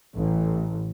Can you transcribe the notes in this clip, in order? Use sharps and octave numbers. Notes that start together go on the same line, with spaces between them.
A1